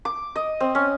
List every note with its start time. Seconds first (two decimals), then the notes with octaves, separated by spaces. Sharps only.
0.05 D6
0.36 D#5
0.60 C4
0.75 C#4